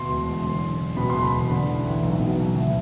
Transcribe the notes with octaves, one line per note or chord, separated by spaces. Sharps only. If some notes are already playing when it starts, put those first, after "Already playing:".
Already playing: D2 B2 C6
E1
E1
D3
F#1
F#1
B2 B5
C6
E1
B5
E1
D3
A1
A1
B1
B2
B1
D2